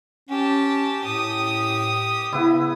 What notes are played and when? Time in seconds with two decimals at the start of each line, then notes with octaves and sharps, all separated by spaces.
0.29 C#4 G4 A5
1.04 A2 G4 D#6
2.33 C#3 B3 E4